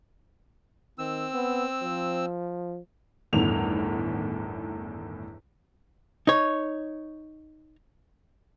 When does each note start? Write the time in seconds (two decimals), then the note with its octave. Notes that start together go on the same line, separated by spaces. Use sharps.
0.98 D#3 C4 E6
1.34 B3
1.82 F3
3.33 G1 E2 A2 D#3 F7
6.27 D#4 C#5